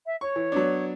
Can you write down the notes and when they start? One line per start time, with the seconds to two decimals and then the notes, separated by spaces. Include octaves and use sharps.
0.06 E5
0.21 C#5 C#6
0.36 E3
0.52 F#3 B3 D4